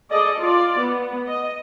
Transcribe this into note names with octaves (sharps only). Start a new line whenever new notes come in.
G#4 A4 D5 D#5
F4 D5
B3
D#5